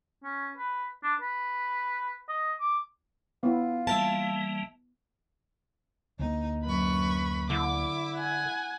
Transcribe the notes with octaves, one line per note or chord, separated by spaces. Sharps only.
C#4
B4
D4
B4
D#5
D6
B3 E4 F4
E3 G3 A#3 E5 F5 A5
D2 A#3 D#4
F#2 B4 B5 C#6
D3 E4 D6
F#5 G#5